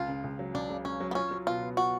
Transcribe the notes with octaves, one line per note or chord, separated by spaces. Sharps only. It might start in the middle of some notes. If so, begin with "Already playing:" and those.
Already playing: C#2 F4
C#3
C#2
F#3
C#2 D4
C#3
C#2 C#4
F#3
B3
C#4 F4
F#3
B2 F4
B3
F4 F#4